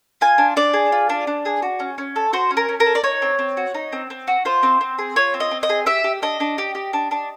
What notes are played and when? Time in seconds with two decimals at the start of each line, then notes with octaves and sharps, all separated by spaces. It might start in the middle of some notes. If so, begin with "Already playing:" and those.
0.21 F4 G#5
0.38 D4
0.56 D4 D5
0.74 G#4
0.92 F4
1.09 D4
1.27 D4
1.45 G#4
1.62 F#4
1.80 C#4
1.98 C#4
2.16 A4
2.33 F#4 C5
2.51 C#4
2.57 A#4
2.69 C#4
2.80 A#4
2.86 A4
2.95 D5
3.04 D#4 C#5
3.22 C4
3.39 C4
3.57 F#4
3.75 D#4
3.93 C4
4.10 C4
4.28 F#4
4.45 F4 C5
4.63 C4
4.81 C4
4.98 G#4
5.16 F4 C#5
5.34 C4
5.40 D#5
5.51 C4
5.63 D#5
5.70 G#4
5.86 G4 E5
6.04 G4
6.22 D4 D#5
6.40 D4
6.58 G4
6.75 G4
6.93 D4
7.11 D4